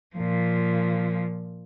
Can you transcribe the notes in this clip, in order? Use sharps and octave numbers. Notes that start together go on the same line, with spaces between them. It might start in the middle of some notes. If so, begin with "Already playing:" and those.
A#2 F3